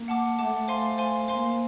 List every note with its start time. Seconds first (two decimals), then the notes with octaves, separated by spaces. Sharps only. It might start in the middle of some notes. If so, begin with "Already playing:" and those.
Already playing: A#3
0.08 F#5 A5 D6
0.39 A3 F#5 A5 D6
0.68 C5 F5 G#5 C6
0.98 C5 F5 G#5 C6
1.28 A#3 C5 F5 G#5 C6